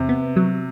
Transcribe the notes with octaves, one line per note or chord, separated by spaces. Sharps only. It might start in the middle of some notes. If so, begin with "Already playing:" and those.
Already playing: E2 C3
B3
F#3